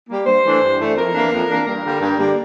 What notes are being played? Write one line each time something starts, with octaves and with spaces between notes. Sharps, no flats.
G3 A#3
G2 C5
E3 A3 D4
G2
E3 A3 D4
F2 A#4
E3 A#3 D4
F2
E3 A#3 D4
G2 A#4
D3 G3 A#3
G2
D3 G3 A#3